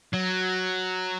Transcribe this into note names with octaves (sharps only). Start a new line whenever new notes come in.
F#3